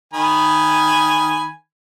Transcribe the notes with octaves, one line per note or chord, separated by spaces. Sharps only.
D#3 G#5 B5